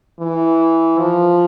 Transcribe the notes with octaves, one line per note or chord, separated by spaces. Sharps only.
E3
F3